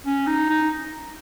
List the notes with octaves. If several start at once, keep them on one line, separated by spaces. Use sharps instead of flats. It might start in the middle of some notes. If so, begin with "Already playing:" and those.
C#4
D#4
D#4